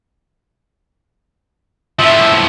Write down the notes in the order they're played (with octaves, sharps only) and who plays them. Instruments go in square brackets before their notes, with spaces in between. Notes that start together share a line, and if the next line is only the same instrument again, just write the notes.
[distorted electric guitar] A2 F3 [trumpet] E5